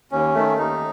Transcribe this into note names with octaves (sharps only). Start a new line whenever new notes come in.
D#2 C#4
D#3 A3
D#2 D#4